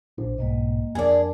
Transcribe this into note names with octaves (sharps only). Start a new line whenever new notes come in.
A#1 D4 C5
B1 G#2 G3 A#3 D#5
F2 D4 G#4 A#4 D5 A5